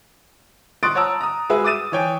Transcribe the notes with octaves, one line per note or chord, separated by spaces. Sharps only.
C6 C#6 D#6 F#6 A6 D7
C#5 F#5 A5 A#5 E6
A#5 D#6
G#3 F#4 G#4 B4 E5
D6 D#6 A6 D#7 E7
E3 C#5 G5 G#5